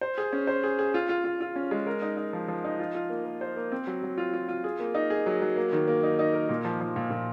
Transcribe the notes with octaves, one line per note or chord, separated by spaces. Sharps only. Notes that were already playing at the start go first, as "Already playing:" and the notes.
C5
G#4
C#4
C5
G#4
G#4
F4
F4
F4
F4
C#4
G#3
A#4
D#4
D#4
F3
F3
D#4
F4
F4
A#3
A#3
C5
A#3
C4
F#3
F#3
F4
F4
F4
G#4
A#3
D#4
G#4
F#3
F#3
A#3
D#3
A#3
D#4
D#4
A#4
A#2
F3
F3
A#2
A#2